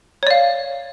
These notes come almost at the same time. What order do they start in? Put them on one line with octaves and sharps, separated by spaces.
C#5 D5 F5